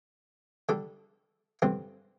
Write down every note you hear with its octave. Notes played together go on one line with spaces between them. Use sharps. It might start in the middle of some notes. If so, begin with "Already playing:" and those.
D3 G3 D4 A4
G2 D3 G3 C4